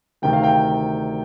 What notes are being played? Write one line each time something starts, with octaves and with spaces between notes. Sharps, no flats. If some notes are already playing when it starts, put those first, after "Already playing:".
D2 C3 D#3 G5
F5
G5